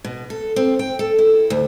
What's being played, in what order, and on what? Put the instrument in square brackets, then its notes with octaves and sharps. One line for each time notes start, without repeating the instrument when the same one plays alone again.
[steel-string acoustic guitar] B2
A4
C4
G5
A4
E4
D2